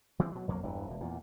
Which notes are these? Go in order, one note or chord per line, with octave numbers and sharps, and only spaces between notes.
E3 G3 G#3 C4
B2 F#3
B1 F2 F#3 A#3
E1 G2 E3
E1 B2
E2 A#2